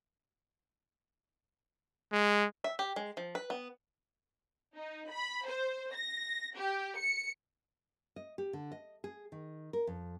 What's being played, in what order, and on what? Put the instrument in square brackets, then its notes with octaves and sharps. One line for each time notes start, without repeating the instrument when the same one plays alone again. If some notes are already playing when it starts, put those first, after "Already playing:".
[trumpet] G#3
[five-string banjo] E5
G4
G#3
F3
B4
B3
[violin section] D#4
B5
C5
A#6
G4
C#7
[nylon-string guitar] D#5
G4
D3
D#5
G#4
D#3
A#4
F2